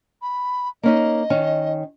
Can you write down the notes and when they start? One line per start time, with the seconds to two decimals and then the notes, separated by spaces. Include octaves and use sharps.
0.22 B5
0.83 A#3 C#4 D#4 D#5
1.30 D#3 C#4